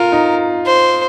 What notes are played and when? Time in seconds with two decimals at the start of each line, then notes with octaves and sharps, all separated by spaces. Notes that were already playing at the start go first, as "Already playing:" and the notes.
Already playing: F4 A#4
0.12 D#4
0.66 C5